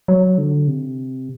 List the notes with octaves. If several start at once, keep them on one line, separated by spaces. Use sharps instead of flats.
F#3
D3
C3